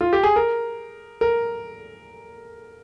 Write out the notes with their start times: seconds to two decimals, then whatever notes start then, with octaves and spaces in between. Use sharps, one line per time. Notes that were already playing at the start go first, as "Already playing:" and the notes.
0.01 F4
0.13 G4
0.23 G#4
0.36 A#4
1.21 A#4